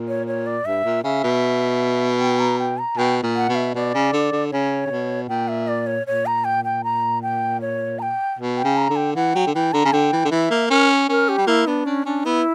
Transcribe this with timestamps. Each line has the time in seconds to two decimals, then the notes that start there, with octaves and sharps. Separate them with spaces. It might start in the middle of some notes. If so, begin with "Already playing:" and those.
Already playing: A#2
0.08 C#5
0.27 C#5
0.46 D5
0.65 G2 E5
0.84 A#2
1.04 C#3 E5
1.24 B2
2.20 G5
2.39 A#5
2.59 G5
2.78 A#5
2.97 B2 G5
3.23 A#2
3.36 F#5
3.49 B2
3.55 E5
3.75 B2 D5
3.94 C#3
4.13 D3
4.32 D3
4.51 C#3 C#5
4.86 C#3
4.90 B2
5.29 A#2 G5
5.48 E5
5.68 D5
5.87 C#5
6.06 A#2 C#5
6.26 A#5
6.44 G5
6.64 G5
6.84 A#5
7.23 G5
7.61 C#5
7.99 A#5
8.02 G5
8.39 B2
8.57 G5
8.64 C#3
8.77 A#5
8.90 D3
8.96 G5
9.15 E3 F#5
9.35 F#3 G5
9.47 D3
9.55 E3 G5
9.73 D3 A#5
9.85 C#3
9.93 D3 G5
10.12 E3
10.25 D3
10.31 E3 E5
10.51 A#3
10.70 C#4 A#4
11.09 C#4 A#4
11.29 G4
11.38 G3
11.47 A#3 E4
11.67 B3 D4
11.86 C#4 D4
12.05 C#4 D4
12.25 B3 E4